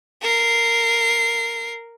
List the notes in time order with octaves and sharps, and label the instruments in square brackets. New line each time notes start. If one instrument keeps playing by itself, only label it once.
[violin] A#4 C7